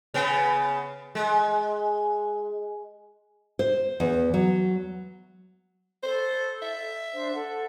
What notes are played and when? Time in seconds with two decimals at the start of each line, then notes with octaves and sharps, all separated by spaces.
0.14 C#3 B3
1.15 G#3
3.59 C5
4.00 E2
4.34 F#3
6.03 A4 C5
6.62 E5
7.13 D4 C5
7.33 A4 F#5